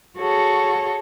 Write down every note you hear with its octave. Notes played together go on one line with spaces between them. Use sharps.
F#4 G#4 A4 C#5